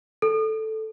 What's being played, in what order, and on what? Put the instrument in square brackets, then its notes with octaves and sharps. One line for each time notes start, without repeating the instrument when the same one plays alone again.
[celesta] A4